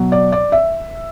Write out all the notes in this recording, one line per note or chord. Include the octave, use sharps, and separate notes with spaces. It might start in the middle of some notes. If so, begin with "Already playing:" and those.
Already playing: B2 F#3
D5
D5
E5